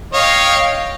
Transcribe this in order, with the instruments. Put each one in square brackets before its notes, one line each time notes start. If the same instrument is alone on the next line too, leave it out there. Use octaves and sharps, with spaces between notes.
[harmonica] C#5 D#5 [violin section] F5 G5